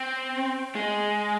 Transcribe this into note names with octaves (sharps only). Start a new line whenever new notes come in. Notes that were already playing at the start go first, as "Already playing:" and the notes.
Already playing: C4
G#3